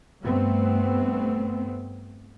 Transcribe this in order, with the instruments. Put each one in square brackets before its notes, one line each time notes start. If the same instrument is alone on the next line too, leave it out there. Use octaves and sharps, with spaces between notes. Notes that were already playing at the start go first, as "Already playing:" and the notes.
[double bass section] G2 A3 B3 C4